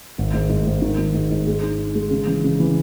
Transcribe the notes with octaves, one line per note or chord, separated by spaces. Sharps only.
G#1
G#2
G#2
G#2
D#3
D#3
G#2
G#2
G#3
D#4
D#4
G#3
C#3
E3
C#3
E3